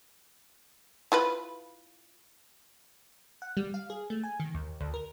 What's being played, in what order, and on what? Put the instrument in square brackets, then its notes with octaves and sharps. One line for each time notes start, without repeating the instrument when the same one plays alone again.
[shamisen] E4 F4 B4
[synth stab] F#5
G3
F5
G#4
A3
G#5
D#3
D#2
D2
A#4